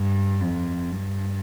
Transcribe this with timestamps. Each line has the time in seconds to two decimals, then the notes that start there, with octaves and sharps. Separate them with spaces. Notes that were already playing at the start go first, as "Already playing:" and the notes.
Already playing: G2
0.41 F2
0.92 G2